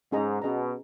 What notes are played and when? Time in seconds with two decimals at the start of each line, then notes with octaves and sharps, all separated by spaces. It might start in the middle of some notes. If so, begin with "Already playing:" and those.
0.12 G#2 C#4 G#4 D#5 A#5
0.42 B2 C#4 G#4 D#5 A#5